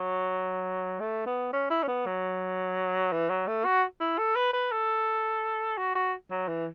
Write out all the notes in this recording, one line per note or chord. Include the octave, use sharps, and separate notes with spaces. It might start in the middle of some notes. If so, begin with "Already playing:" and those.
Already playing: F#3
A3
B3
C#4
E4
C#4
B3
F#3
E3
F#3
A3
F#4
E4
A4
B4
B4
A4
F#4
F#4
F#3
E3